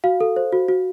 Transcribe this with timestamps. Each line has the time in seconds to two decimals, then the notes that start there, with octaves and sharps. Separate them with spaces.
0.04 F#4 F5
0.20 A4
0.36 C5
0.52 F#4
0.68 F#4